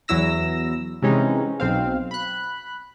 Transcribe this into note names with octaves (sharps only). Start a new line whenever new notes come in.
E2 F#3 E4 E6 A#6
C3 E3 G#3 C#4 D#4
B1 C4 F5
B5 F#6